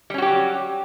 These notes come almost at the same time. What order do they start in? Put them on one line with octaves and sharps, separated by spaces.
G3 C#4 F#4 G4 F#3